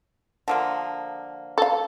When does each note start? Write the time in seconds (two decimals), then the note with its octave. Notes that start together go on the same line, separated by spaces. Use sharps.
0.48 D3 F3 A#3
1.58 A4 F5